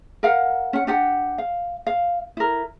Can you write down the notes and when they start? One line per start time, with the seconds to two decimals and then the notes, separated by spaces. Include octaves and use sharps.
0.23 A#4 F5 F#5
0.73 C#4 F#5
0.87 D4 G4 F#5
1.38 F5
1.87 F5
2.37 E4 A#4